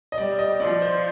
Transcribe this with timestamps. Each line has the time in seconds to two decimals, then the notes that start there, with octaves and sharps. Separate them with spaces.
0.12 D#5
0.18 G3 D5
0.39 D#5
0.60 F3 D5
0.82 C5